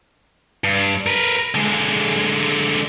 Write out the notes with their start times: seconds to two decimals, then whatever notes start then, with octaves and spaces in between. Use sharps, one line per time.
0.64 G2
1.06 A#4 B4
1.55 D3 G#3